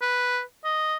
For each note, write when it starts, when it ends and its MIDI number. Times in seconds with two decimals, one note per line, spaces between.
0.02 0.42 71
0.64 0.96 75